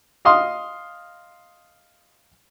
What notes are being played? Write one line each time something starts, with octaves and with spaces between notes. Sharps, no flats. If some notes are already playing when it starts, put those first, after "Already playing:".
D#5 F5 C6 D#6